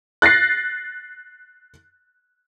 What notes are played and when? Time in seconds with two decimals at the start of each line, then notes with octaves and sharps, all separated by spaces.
0.22 F#6 A6 A#6 C7